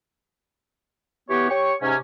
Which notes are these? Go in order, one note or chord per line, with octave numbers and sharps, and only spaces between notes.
E3 B3 G4 C#5
G4 C#5 C#6
G#2 C3 C#4